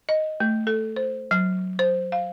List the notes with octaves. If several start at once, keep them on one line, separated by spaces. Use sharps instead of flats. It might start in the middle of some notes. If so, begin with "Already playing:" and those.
D#5
A3
A4
C5
F#3
C5
F5